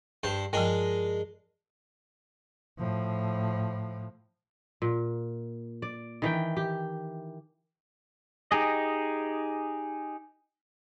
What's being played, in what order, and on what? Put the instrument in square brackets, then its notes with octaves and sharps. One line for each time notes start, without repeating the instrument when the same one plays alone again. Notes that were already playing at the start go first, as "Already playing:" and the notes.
[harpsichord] G2 C5 A5
[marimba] G2 F3 [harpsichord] G#3 D4 A#4
[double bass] A2 F3
[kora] A#2
D5
D#3 E3 G5
G4
[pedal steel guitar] D#4 G4 G#4 D#5